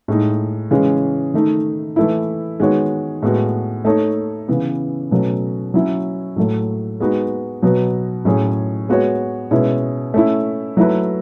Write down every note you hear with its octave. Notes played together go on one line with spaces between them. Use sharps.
A2 G#3 D#4
C#3 E3 G#3 C#4
D#3 A3 D#4
E3 A3 E4
D#3 G#3 B3 F#4 C#5
A2 G#3 B3 F#4
A3 D#4 A4 C#5
C#3 E3 B3
B2 F#3 A3 C#4
F#3 C#4 E4
A2 F#3 A3
G#3 B3 D#4 F#4 B4
B2 F#3 B3 F#4
A2 F#3 C#4 G#4 C#5
G#3 B3 F#4 C#5
B2 G#3 C#4 E4
A3 C#4 E4
F#3 A3 E4 B4